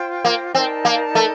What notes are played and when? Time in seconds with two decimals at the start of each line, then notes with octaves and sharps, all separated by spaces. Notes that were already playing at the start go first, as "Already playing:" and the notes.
Already playing: F4 C5 G5
0.25 A#3
0.55 C4 D#4 A#4 D5 A5
0.85 A#3
1.15 A3